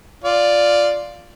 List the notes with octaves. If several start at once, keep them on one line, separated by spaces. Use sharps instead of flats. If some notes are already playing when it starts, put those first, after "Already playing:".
F4 D5